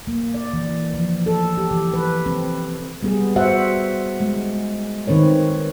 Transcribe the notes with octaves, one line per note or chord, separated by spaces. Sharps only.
A#3
D5
E3
F3
A4
G4
E3
B4
C4
G3 B3 G#4
F#4 C5 E5 F#5
G#3
D#3 C4 B4 C#5